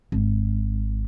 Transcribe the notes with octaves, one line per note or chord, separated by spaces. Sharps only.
G#1